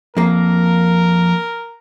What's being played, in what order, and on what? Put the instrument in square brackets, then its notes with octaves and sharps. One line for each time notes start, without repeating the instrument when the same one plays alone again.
[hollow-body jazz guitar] F2 A#3 [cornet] A#4